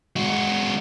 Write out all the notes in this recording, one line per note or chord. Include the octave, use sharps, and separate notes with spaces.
G#3 F#4